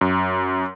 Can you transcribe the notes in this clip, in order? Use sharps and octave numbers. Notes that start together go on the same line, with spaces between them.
F#2